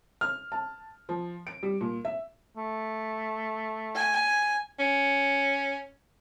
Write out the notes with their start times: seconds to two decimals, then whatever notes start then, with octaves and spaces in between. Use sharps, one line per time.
0.21 F6
0.52 A5
1.09 F3
1.47 D7
1.63 G3
1.81 A#2
2.05 E5
2.57 A3
3.95 G#5
4.79 C#4